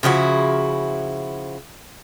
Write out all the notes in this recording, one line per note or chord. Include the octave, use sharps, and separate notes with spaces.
C#3 F3 E4 F#4